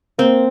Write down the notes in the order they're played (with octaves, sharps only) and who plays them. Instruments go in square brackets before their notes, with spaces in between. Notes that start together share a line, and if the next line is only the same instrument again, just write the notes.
[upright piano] A#3 [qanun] C4